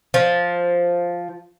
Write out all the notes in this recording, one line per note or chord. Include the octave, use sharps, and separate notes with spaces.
F3